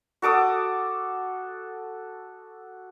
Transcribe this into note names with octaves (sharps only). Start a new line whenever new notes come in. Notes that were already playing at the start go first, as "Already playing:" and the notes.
F#4 A4 D6 D#6